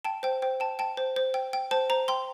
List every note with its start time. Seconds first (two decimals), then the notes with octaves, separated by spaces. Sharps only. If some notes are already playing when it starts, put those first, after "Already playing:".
0.05 G5 A5
0.23 C5 G5
0.42 C5 G5
0.60 G5 A5
0.79 G5 A5
0.97 C5
1.16 C5
1.34 G5
1.53 G5
1.71 C5 A5
1.90 C5 A#5
2.08 G5 C6